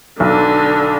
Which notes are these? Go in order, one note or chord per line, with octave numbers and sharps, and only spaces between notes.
B1 D3